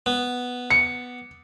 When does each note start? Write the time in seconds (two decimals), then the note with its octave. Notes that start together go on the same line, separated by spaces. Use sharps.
0.06 B3
0.70 C#7